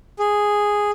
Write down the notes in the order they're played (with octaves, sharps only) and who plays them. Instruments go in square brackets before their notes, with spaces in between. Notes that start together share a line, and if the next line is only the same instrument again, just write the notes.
[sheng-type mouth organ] G#4